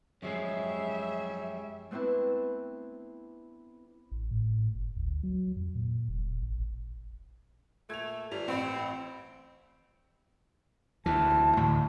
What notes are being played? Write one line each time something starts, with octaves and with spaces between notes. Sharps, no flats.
F#2 F3 G3 G#3 G#4 C#5 E5
A3 B3 C4 D4 E4
A1
A2
G1
D2
F#3
F2
A#2
E1
A1
A#2 A3 G#6 F7
G1 G3 F7
A1 C4 B5
D2 E3 A5
D2 A2